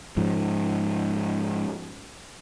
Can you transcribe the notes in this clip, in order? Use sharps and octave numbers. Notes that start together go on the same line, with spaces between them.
G#2 F3